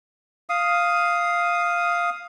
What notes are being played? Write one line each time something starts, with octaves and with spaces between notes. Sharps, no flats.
F5 D#6